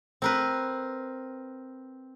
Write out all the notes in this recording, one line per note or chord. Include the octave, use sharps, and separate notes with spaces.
C4 A#4 B4